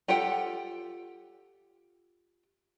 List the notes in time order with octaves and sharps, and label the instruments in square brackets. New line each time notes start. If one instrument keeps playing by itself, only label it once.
[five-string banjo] F4 G4 A4 F#5 G5